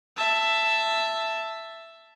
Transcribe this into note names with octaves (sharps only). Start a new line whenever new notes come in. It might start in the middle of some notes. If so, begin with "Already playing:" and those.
E5 A5